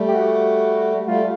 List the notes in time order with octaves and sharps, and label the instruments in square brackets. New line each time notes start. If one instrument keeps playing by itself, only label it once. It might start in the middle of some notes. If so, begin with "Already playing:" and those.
Already playing: [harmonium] G3 A3
[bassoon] G4
F#4
[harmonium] G3 A3 [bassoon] F4